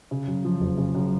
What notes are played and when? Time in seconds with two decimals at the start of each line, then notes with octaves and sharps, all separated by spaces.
0.11 C#3
0.27 F#2
0.45 F3
0.60 F#1
0.78 C#3
0.95 F#2